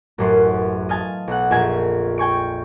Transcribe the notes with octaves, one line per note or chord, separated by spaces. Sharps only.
A1 F#2 C6
D#5 F5 G#5 A5
B1 F#5
A#1 F2 E5 G#5 G#6
G5 G#5 C#6 D7